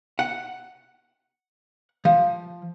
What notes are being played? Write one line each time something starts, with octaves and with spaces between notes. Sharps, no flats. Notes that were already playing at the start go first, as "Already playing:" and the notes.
F#5
F3